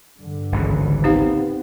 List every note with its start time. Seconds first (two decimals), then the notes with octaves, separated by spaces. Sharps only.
0.19 G2 D3
0.52 G#1 C#2 E3
1.04 B3 C4 D#4 G4 F5